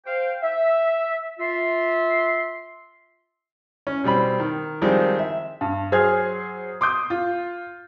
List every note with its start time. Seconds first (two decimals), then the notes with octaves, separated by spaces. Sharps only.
0.06 C5 F5 G5
0.43 E5
1.39 F4 E5 C6
3.87 C#4
4.04 B2 G3 C4 B5
4.40 D#3
4.82 D#3 F3 G3 G#3 C4
5.19 E5
5.61 G2
5.92 F#3 G#4 C5 F6 G#6
6.81 C6 D6 D#6 G6
7.10 F4